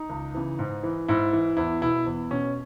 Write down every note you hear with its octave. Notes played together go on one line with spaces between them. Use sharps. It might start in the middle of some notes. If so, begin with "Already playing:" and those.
Already playing: D#4
C#2
C#3 E3
G#2
E3
G#2 E4
E3
E2 E4
B2 E4
E2
B2 C#4